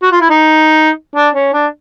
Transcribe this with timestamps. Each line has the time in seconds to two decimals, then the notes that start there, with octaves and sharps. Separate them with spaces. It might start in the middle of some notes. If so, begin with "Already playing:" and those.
0.02 F#4
0.12 F4
0.21 E4
0.30 D#4
1.15 D4
1.35 C#4
1.53 D4